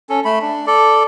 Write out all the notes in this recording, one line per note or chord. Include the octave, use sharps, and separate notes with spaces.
C#4 A4
A3 B5
D4
A4 D5